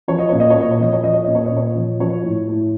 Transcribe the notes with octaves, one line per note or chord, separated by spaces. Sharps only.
F3 C#5
D#5
A#2 C#5
D#5
C#5
A#2
D#5
C#5
F3 D#5
C#5
F3 D#5
C#5
A#2 D#5
C#5
D#5
A#2
C#5
F3
F3 C#5
A2
A2